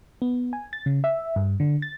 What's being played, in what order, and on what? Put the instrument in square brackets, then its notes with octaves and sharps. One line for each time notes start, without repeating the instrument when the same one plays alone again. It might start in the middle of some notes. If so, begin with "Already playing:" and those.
[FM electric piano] B3
G#5
A6
C#3
E5
G2
D3
A6